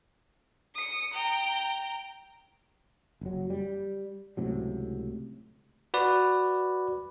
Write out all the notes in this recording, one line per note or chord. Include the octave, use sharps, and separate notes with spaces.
D#6 C#7
G5 A#5
F#1 F#3
G3
C#2 A2 C3 F#3
F#4 B4 D5